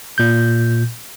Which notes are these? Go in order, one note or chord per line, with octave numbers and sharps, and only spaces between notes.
A#2 G6